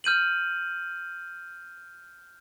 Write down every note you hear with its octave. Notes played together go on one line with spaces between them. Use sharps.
F6 G6 D#7 F#7